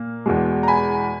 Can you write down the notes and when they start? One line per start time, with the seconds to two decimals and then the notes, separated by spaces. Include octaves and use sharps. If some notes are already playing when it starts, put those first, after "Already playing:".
Already playing: A#2 A#3
0.26 E2 B2 G#3
0.63 A#5
0.68 G#5 B5